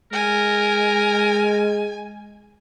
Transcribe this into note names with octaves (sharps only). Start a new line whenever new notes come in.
G#3 A#4 G#5